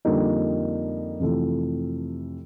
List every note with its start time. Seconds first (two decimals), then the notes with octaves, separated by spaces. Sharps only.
0.05 F2 D3 G3 A#3 D#4
1.20 F2 C3 E3 A3